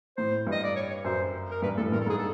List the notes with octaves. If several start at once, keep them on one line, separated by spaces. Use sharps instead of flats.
A2 C5
G2 D#5
D5
C#5
C#5
F#2 C5
A#4
G2 B4
A2 A4
G2 A#4
A4
G#2 G#4
A4